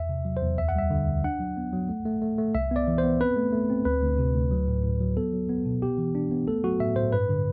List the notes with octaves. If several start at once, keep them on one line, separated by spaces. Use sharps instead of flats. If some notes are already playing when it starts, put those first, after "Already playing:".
Already playing: E2 E5
C3
F#3
C5
E2
D2 E5
F#5
G3 E5
D3
D2
D4 F#5
F#3
B3
F#3
A3
A3
A3
A3
C2 E5
B3 D5
E3
C5
B3
C4 B4
A3
A3
C4
D2 B4
D2
C3
D2
F#3
A2
A2
F#3
B3 A4
F#3
B3
B2
B3 G4
E3
D4
B3
A3 A4
F#3 F#4
A2 E5
A2 C5
G2 B4
D3